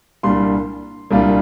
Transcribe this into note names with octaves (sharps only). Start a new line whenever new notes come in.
C2 A#2 G3 D4 F4 C6
C2 A#2 G3 D4 F4